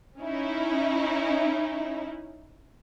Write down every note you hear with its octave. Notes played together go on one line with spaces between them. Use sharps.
C#4 D#4 E4